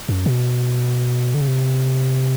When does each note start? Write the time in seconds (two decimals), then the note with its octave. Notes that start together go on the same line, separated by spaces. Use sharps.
0.09 F#2
0.26 B2
1.34 D3
1.41 C#3
1.48 C3